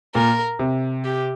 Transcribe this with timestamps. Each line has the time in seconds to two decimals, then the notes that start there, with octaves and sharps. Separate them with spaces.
0.15 A#2 A#4
0.59 C3
1.05 G4